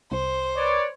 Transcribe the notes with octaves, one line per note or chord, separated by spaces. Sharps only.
C2 C5
B4 C#5 D5